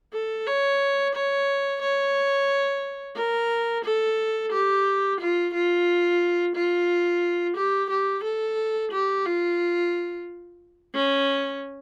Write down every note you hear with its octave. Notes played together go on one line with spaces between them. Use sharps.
A4
C#5
C#5
C#5
A#4
A4
G4
F4
F4
F4
G4
G4
A4
G4
F4
C#4